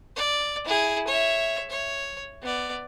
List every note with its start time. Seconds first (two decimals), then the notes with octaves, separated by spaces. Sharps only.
0.16 D5
0.65 E4 G#4
1.07 C#5 E5
1.70 C#5
2.42 B3 D5